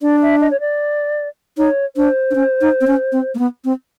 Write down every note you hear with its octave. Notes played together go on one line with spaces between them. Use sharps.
D4 D5
E5
D#5
C#5
D5
D#4 C#5
D4 C5
D4
C#4
D#4
C4
C#4
C4
A#3
B3
C4